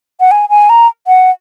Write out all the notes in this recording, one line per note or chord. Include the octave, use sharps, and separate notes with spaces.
F#5
G#5
G#5
A#5
F#5